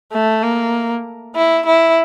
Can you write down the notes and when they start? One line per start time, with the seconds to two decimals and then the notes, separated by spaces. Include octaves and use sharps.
0.13 A3
0.43 A#3
1.36 E4
1.67 E4